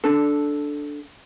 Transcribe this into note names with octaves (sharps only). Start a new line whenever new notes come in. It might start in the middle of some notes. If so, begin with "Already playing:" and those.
D4 A4